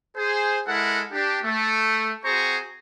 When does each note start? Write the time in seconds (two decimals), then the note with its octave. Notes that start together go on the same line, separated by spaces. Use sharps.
0.16 G#4 C5
0.68 G#3 E4 A4 A#4 F#5
1.13 D4 G4
1.43 A3
2.24 C4 F#4 G#4 C5 A#5 C#6